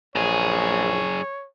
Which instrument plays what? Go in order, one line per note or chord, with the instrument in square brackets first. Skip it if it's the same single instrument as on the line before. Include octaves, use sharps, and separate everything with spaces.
[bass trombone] A#1 [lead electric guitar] F#2 G#4 [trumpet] C#5